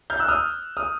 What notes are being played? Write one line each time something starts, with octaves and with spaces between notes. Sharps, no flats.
F6 G6
E6 F#6
D#6 F6
D#6 F6